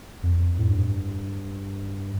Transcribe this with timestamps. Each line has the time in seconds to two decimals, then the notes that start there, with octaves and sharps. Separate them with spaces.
0.23 F2
0.59 A2
0.70 G2